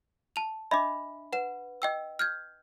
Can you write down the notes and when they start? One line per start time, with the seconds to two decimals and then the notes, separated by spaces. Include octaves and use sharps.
0.36 A5 F7
0.71 D4 D#5 E5 B5 D6
1.33 B4 F#5 E7
1.82 D#5 G5 E6
2.19 F6 G6 G#6